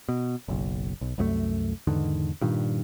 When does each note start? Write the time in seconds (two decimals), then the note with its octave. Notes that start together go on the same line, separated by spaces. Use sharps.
0.09 B2
0.48 F#1 B1
1.01 B1
1.18 C2 F#2 G#3 A3
1.87 E2 G#2 D3 D#3
2.41 G2 A#2 D#3